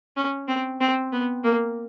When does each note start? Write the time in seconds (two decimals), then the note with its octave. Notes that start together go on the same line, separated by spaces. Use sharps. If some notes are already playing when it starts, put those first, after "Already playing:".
0.16 C#4
0.48 C4
0.80 C4
1.12 B3
1.44 A#3